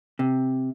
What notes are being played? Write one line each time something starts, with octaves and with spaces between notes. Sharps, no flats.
C3